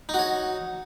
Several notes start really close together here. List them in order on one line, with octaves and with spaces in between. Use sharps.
D#4 F#4 C#5